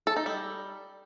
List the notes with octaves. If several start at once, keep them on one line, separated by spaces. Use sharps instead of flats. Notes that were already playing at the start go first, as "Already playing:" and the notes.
A4
D#4
G3